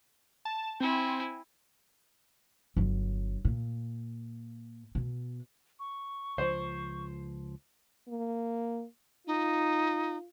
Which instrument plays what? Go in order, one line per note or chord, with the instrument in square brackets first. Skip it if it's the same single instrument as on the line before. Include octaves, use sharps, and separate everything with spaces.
[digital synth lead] A5
[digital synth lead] C4 [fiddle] E4 G#5
[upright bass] G1 F#3
A#2
B2
[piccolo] C#6
[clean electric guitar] C#2 F3 [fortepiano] C5
[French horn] A#3
[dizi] D#4 [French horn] F4